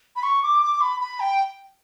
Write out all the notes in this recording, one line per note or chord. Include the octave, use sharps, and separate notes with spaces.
B5
C#6
D6
D6
B5
B5
G5